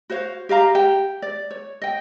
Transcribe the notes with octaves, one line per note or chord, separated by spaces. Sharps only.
F#4 C5 C#5 F5
G4 D#5 F5 A#5
G4 G5
D5
C#5
D#5 G5